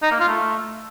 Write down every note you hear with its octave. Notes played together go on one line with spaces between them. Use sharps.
D#4
A#3
F4
A3